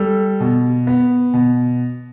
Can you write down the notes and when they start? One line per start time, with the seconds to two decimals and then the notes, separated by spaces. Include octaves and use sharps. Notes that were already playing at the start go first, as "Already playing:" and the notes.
Already playing: G3 A4
0.40 B2
0.87 B3
1.34 B2